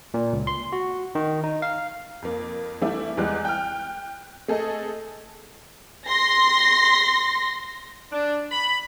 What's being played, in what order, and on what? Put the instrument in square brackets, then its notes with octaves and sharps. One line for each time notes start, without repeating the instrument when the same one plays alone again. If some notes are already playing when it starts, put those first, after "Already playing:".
[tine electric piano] A#2
C#2
C6
F#4
D#3
D#4
F5
[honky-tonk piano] F2 A#3
E3 G3 A3 D4 E4
E2 E3 G3 G#3 F#6
G5 F6
A3 G#4 A4 D#5
[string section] C6 A#6
[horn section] D4
B5